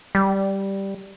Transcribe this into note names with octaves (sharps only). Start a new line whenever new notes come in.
G3